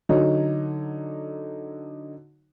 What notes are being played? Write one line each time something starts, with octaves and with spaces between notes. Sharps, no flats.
D3 F#3 D#4 C#5